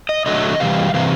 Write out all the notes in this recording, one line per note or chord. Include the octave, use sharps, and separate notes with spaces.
D#5
D3 F#3 A3 D#5
C3 E3 G3 F5
C3 E3 F5